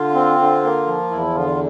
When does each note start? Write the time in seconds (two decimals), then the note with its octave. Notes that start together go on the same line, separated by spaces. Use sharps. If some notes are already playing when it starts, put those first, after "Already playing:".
Already playing: D3 F4
0.14 C4
0.39 D3
0.63 A#3
0.87 F3
1.11 E2 E4
1.35 D3 F4